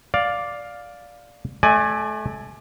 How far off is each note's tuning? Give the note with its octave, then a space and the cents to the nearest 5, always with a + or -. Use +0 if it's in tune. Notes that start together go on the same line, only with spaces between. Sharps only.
D5 +0 F5 +10
A3 -30 D5 +25 G#5 +0